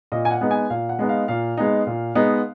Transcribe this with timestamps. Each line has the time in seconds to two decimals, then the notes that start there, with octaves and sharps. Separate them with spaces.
0.12 A#2 D#5
0.25 G#5
0.31 F#5
0.41 G#3 B3 D#4
0.51 G#5
0.70 A#2 F5
0.89 F#5
0.99 G#3 B3 D#4
1.09 F5
1.28 A#2 F5
1.57 G#3 B3 D#4
1.87 A#2
2.15 G#3 B3 D#4